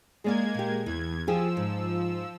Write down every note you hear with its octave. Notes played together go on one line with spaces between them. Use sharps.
G#3 A#3 G#4 D5 F5 G#6
A#2 G4
E2 E3 G#6
F3 F4 G4 G#4 E6
G#2